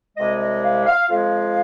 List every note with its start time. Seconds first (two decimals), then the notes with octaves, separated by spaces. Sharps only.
0.16 C2 C3 G#3 D#5
0.39 D#5
0.63 F5
0.86 F5
1.09 F2 F3 G#3 F4 F5